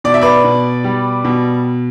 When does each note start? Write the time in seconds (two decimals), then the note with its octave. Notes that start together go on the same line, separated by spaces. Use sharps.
0.04 B2 D5
0.14 E5
0.21 B4 D5
0.44 B2
0.84 G3
1.24 B2